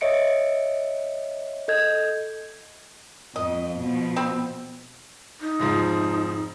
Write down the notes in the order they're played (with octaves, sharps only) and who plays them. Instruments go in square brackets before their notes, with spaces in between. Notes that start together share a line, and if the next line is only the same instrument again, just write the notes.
[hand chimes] C#5 D#5 E5 C#7 D7
A4 D#5 G6 G#6
[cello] F2 [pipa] D#5
[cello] B2 F3
[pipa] C4 B5
[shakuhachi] D#4
[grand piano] F1 G#2 F3